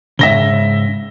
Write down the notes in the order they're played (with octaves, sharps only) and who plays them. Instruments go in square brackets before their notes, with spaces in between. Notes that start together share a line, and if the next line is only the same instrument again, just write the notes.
[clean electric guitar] G#2 C#3 [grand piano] E5 A#6 G7